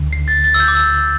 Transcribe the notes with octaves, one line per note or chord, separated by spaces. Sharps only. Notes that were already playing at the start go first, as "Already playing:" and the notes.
Already playing: D2 D3
C7
A6
A6
E6
G6
D6
E6